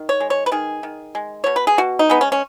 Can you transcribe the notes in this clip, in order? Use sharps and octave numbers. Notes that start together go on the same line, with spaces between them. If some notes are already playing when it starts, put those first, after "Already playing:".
Already playing: D#3
C#5
G#3
C#5
B4
D#3 G#4
D#3
G#3
B2 C#5
B4
G#4
B2 F#4
D#4
G#3 B3
C#4
C#4